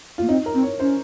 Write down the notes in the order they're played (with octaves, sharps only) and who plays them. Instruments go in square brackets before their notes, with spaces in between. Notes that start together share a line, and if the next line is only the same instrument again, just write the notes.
[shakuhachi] A#3 [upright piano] F4
[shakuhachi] C4 [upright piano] D#4
[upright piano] A#4
[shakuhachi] C4
[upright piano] C#5
[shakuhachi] C#4 [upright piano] C5